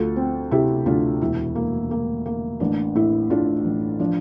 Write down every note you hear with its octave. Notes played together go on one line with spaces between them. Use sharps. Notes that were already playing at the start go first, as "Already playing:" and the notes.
Already playing: D2 F4 A4
C4
C3 E4 G4
D2 D4 F4
E1 E4
A#3
A#3
A#3
A1 D4
A2 E4
A2 D4 F4
A1
F3 D4